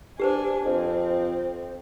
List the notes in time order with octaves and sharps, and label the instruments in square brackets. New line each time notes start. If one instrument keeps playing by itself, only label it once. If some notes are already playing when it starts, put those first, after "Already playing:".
[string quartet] D4 G#5 [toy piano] G4 B4 C5
[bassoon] F2 [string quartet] C4